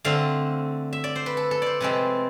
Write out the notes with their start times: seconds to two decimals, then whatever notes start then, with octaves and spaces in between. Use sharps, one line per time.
0.05 D3 A3 C4 F5
0.93 E5
1.04 D5
1.16 C5
1.26 B4
1.37 A4
1.51 A4
1.62 C5 D5
1.81 C3 F3 G#3 C4 B4